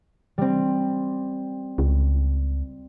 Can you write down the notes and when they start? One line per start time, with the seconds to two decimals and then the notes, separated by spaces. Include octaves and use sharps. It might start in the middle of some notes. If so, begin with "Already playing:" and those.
0.38 G3 C4
1.78 C#2